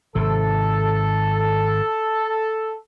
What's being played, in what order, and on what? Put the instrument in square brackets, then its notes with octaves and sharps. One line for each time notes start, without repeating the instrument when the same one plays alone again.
[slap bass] G#1 C3 [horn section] A4